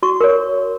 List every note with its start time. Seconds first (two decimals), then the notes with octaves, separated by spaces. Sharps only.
0.03 F#4 C#6
0.21 A#4 C#5